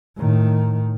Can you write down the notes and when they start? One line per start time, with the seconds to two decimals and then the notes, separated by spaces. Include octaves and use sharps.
0.17 A2 D#3